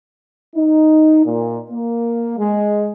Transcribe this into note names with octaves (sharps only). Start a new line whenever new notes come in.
D#4
A#2
A#3
G#3